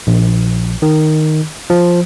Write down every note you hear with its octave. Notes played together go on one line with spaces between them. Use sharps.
A#1
D#3
F3